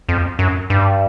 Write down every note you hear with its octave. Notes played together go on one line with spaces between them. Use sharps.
F2
F#2
G2